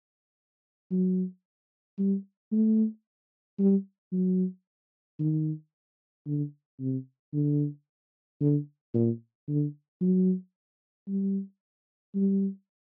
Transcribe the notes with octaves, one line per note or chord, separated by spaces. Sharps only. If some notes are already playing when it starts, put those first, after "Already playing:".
F#3
G3
A3
G3
F#3
D#3
D3
C3
D3
D3
A#2
D3
F#3
G3
G3